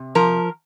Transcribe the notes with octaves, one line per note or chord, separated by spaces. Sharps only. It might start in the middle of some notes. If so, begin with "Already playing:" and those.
Already playing: C3
F3 A#4